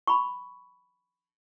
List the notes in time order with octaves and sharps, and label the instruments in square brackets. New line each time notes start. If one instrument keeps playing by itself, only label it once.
[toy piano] B5 C#6